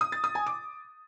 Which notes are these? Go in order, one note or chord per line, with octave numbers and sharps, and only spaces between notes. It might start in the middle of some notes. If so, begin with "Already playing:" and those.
D#6
A6
D#6
G#5
D6